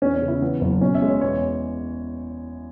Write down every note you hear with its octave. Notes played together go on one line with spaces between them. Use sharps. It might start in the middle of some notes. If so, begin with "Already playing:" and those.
E2 C#4
C#4
C#3
E4
E3 B3
F#1
B2 C#4
E5
G#3
C#5
E2 C#5